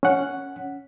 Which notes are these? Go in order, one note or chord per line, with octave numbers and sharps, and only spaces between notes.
C#4 F#5